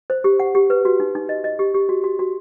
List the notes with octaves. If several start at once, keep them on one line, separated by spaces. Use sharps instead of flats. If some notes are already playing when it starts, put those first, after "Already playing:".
C5
G4
F#5
G4
B4
F#4
D#4
D#4
D#5
D#5
G4
G4
F#4
F#4
F#4